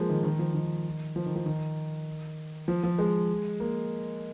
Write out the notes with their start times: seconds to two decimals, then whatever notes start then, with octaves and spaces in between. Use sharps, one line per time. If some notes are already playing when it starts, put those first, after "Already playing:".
Already playing: F3 G#3 A#3
0.09 D#3
0.23 D#3
0.39 F3
0.54 D#3
1.16 F3
1.26 D#3
1.36 F3
1.46 D#3
2.68 F3
2.83 F3
2.99 G#3
3.60 A#3